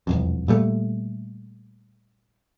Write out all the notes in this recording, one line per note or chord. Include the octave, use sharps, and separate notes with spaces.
E1 C2 F2
A#2 G3 A3